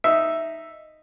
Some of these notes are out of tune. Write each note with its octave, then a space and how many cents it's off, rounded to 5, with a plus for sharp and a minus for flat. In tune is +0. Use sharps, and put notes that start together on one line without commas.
D#4 +0 E5 +0